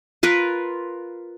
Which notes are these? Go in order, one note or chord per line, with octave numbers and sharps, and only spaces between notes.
F4 A#4 B4